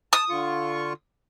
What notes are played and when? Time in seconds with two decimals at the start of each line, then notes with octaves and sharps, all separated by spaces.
0.13 A5 D#6
0.29 D3 F4 C#6